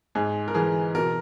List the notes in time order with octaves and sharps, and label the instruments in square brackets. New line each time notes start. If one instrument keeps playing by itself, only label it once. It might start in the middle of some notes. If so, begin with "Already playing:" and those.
[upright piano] G#2 G#4
A#4
E3 G#4
B2 A#4